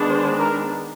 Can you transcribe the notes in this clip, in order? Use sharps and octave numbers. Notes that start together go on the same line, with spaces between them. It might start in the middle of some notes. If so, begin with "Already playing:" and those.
Already playing: D#3 G#3 B3 D4
C5
A#4